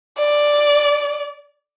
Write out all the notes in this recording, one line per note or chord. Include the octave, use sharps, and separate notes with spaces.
D5